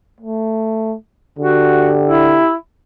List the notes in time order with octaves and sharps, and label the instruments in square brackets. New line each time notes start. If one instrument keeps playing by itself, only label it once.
[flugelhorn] A3
[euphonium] D3 [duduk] F#4 [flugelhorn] G4
[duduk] E4